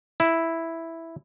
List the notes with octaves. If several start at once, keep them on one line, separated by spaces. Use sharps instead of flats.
E4